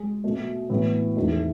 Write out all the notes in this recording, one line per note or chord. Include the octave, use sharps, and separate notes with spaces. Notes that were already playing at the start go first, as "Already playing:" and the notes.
Already playing: G#3 G#4
B2 A3
A2 E3 B3
E2 D#3 A3
G#4